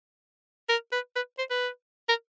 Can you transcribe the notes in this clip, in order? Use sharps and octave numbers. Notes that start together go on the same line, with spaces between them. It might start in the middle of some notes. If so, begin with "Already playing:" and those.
A#4
B4
B4
C5
B4
A#4